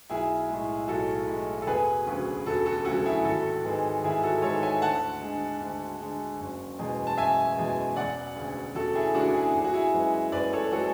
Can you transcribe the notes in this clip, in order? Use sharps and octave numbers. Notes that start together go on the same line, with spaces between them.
B1 E4 G#4
A2 G#3
B1 F#4 A4
A2 G#3
A4
E1 G#4 B4
D2 C#3 F#3
E1 F#4 A4
F#4 A4
D2 C#3 F#3 F#4 A4
E4 G#4
G#1 F#4 A4
G#2 E3 G#3
G#1 E4 G#4
F#4 A4
G#2 E3 G#3 A4 C#5
E5 G#5
D2 F#5 A5
D3 G#3
D2
D3 G#3
F#1
E2 B2 G#3
A5
F#1 E5 G#5
E2 B2 G#3
E1 D5 F#5
D2 C#3
E1 F#4 A4
E4 G#4
D2 C#3 D4 F#4
E4 G#4
F#1 G#4
F#4
E4 G#4
F#2 E3 G#3
F#1 B4 D5
A4 C#5
E3 G#3 F#4 A4